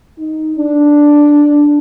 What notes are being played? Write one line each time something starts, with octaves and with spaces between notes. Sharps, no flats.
D#4
D4